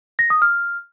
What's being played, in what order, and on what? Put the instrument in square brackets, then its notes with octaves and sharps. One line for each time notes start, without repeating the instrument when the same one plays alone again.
[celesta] A#6
D#6
F6